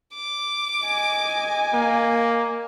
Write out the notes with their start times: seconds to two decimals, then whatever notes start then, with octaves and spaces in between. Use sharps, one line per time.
0.14 D6
0.86 D#5 G#5
1.73 A#3